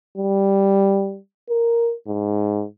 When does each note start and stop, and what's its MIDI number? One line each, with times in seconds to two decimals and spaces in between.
0.17 1.18 55
1.49 1.93 70
2.07 2.64 44